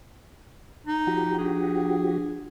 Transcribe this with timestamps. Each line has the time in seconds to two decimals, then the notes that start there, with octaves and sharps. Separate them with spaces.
0.87 D#4
1.07 F3 F#4 G4
1.38 D4 G#4